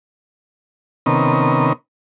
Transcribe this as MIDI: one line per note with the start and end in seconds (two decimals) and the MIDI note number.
1.06 1.73 48
1.06 1.73 51
1.06 1.73 59
1.06 1.73 61
1.06 1.73 70
1.06 1.73 87